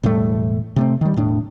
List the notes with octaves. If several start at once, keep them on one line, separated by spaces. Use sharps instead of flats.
E1 A2 G3 A3
C3 A3 C4
D#3 G3
E1 A2 D4